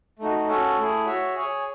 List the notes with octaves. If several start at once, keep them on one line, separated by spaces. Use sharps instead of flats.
A3 D#4 F#4
C#4 F#4 A4
A3 E4 G#4
F#4 C#5 E5
G#4 C#5 G#5